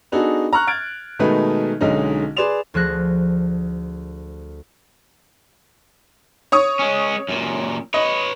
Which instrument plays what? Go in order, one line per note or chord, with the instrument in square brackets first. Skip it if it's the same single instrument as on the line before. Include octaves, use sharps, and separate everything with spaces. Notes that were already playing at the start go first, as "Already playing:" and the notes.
[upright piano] B3 D4 D#4 F#4 G#4 A4
A#5 C#6 F6 F#6
F6 G#6 A6 D7
B2 D#3 G#3 A3 D#4 B4
B1 D3 G#3 C#4 D#4
G#4 B4 D5 C6 E7 F7
[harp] D2 F3 G#4 F#6 A#6
[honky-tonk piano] C#5 C#6 D#6
[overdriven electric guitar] G#3 C#4
F#2 A#2
[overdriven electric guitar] B4 C#5 [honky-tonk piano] D#5